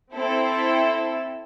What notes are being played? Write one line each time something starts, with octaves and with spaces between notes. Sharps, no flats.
C4 E4 A4